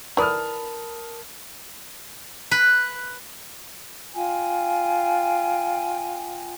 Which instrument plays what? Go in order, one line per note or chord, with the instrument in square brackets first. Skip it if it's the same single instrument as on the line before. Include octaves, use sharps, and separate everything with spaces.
[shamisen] E3 D5 [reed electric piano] A#4 A5 [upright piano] B5 D#6 F6
[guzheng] B4
[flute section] F4 G5 G#5